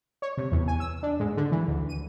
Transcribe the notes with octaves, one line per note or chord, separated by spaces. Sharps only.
C#5
C3
E2
G#5
E6
D4
G#2
D3
E3
D2
D#7